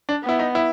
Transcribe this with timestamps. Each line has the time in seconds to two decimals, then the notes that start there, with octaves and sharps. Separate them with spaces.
0.09 D4
0.23 B3
0.29 E4
0.39 D#4
0.55 E4